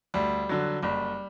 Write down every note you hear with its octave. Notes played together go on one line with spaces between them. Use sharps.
D2 G3
D3 F#3
F#1 G3